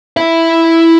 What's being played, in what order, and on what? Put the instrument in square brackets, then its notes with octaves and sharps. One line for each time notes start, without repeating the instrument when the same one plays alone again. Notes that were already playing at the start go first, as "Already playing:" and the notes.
[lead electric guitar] E4 E5